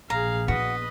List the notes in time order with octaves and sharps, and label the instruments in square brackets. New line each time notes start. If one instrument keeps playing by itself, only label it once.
[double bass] A#1 [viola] G#4 F5 [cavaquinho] A#5
[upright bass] B3 [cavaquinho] F#4 [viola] B4 D#5